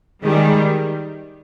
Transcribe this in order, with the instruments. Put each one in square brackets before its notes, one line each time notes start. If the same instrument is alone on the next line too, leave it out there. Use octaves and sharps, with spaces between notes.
[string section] D#3 G3 [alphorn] G#3